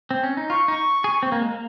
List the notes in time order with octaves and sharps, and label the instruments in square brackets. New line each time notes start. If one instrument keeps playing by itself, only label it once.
[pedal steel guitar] C4
C#4
D#4
[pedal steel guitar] F4 [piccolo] C#6
[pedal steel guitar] D#4
G#4
C4
A#3
G#3
A#3